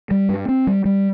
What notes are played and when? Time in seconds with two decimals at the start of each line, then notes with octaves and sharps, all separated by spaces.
0.11 G3
0.29 G2
0.48 C4
0.67 G3
0.85 G3